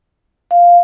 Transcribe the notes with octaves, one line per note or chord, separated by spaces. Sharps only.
F5